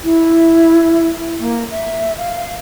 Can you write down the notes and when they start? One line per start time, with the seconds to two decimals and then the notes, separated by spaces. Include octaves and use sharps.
0.03 E4
1.39 A#3
1.70 E5
2.17 F5